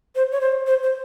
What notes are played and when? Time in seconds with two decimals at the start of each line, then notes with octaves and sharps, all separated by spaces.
0.15 C5
0.32 C#5
0.41 C5
0.67 C5
0.83 C5